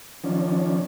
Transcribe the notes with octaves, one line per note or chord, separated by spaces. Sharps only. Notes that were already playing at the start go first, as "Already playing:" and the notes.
D#3 F3 C#4 D4